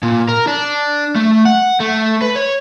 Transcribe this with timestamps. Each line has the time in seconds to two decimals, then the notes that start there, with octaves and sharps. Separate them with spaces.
0.03 A#2
0.28 A#4
0.47 D4
1.15 A3
1.45 F#5
1.80 A3
2.22 B4
2.36 C#5